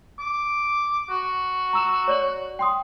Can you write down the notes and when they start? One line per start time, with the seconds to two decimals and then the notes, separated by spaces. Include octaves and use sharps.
0.19 D6
1.10 F#4
1.73 A#5 E6 E7
2.08 C#5 D5 F#7
2.59 G5 C6 D#6